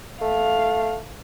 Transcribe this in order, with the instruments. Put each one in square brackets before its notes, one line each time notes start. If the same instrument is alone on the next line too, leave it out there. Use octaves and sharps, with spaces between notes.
[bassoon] A3 [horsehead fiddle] F5